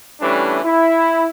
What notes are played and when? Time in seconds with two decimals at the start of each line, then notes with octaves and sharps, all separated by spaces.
0.21 E3 G3 A3 C#4 D4
0.63 E4